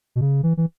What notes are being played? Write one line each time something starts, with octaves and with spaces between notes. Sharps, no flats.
B2
C#3
E3
E3